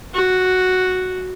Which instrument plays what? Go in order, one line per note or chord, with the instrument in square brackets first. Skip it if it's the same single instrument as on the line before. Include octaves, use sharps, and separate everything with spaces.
[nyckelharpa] F#4